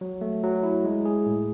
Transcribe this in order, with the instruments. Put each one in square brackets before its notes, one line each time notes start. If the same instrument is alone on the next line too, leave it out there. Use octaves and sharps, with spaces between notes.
[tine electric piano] F#3
A3
F#3
E4
G#3
G#4
A2